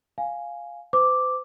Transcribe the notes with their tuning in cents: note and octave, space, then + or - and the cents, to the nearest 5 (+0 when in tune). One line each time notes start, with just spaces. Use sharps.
F5 +0 G#5 +0
C5 -40 D6 +0